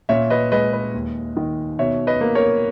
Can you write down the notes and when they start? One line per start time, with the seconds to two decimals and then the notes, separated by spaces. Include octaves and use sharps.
0.09 A#2 C#5 E5
0.30 B4 D#5
0.52 G#3 B4 D#5
0.73 B4
0.94 D#2
1.37 D#3
1.79 B2 C#5 E5
2.07 B4 D#5
2.21 A#3
2.35 A#4 C#5